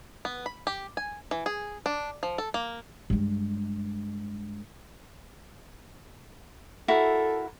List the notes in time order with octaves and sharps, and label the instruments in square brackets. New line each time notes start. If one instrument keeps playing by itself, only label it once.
[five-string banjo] B3
B5
G4
G#5
E3
G#4
D4
F3
A4
A#3
[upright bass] G2 G#3
[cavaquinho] E4 F#4 A#4 [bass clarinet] A4